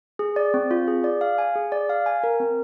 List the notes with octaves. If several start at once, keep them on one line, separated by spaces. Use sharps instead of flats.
G#4
D5
C4
F4
G#4
D5
F5
G#5
G#4
D5
F5
G#5
A#4
C4